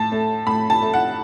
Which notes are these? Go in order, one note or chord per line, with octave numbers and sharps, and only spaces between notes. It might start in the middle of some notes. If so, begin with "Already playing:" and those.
Already playing: A2 A5
A3
A2 B5
A5
A3
F#5